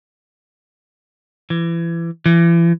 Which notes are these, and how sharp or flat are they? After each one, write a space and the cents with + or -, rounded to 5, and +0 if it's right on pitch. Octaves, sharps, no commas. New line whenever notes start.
E3 +30
E3 +35